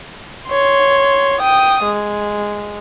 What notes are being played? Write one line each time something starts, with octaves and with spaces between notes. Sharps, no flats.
C#5 C6
G5 D#6
G#3